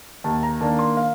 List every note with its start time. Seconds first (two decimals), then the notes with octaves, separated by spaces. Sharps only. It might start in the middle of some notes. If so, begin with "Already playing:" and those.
0.24 D#2 A5
0.43 A#5
0.60 D#3 A#3 D4 A5
0.79 C6
0.97 F5